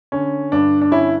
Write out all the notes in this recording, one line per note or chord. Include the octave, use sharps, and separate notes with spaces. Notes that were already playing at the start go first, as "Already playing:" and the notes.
D3 C#4
G2 D4
D4
D3 C#4 E4